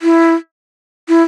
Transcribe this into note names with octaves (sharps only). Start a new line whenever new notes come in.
E4
E4